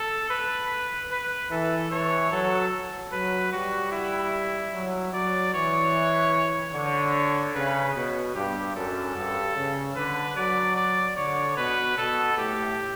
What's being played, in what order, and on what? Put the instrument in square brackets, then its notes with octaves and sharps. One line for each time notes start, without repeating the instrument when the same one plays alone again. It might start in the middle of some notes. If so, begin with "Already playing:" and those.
Already playing: [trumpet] A4
B4
B4
[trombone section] E3 [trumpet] A4
[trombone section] E3 [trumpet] C#5
[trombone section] F#3 [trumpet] A4
[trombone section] F#3 [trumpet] B4
[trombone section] G3 [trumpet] F#4
[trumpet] E4
[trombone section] F#3
[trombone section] F#3 [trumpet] D5
[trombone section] E3 [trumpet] C#5
[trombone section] D3 [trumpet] C#5
[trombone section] C#3 [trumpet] B4
[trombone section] B2
[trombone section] G2 [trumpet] G4
[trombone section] F#2 [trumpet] A4
[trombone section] G2
C#3
[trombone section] D3 [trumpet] B4
[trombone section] F#3 [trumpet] D5
[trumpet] D5
[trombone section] D3 [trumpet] C#5
[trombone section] B2 [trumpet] B4
[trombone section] B2 [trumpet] A4
[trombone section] A2 [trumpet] G4